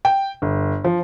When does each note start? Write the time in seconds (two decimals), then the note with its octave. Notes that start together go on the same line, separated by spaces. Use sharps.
0.05 G5
0.42 G1
0.84 F3